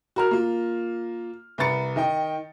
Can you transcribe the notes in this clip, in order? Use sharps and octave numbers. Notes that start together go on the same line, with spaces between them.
F#4 A#4 F6
A#3 F4
C2 B4 A#5 A6 C#7
D#3 D#5 G5